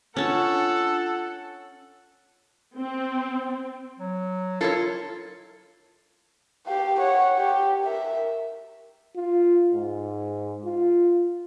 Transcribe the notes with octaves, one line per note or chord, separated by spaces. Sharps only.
C#4 D4 F4 A4 F#5 A5
C4
F#3
E4 F4 A4 A#4 C#5
G4 F5
C#5 F#5
G4
A#4 E5
F4
G#2
F4